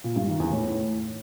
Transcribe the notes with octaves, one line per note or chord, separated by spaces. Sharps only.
A#2
G2
D#3
E2
A2